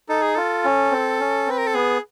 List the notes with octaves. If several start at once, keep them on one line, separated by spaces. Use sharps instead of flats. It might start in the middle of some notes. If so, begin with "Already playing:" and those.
D#4 A4
G#4
F4 A4
C#4
C4
C#4
C4 B4
A#4
A4
B3 G#4